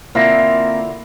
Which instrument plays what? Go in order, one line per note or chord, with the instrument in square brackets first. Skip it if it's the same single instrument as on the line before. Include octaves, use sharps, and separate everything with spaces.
[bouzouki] D3 E4 F4 [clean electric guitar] A#3 C4